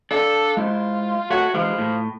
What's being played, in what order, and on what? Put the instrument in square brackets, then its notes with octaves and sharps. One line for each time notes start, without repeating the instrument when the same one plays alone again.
[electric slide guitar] D4 D5 F5 [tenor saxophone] A4
[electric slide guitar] G#3 E4 C5 [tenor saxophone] F4
[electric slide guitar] A3 C#5 F#5 [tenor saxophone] F#4
[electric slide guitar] E3 G#3 [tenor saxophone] F3
[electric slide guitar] A2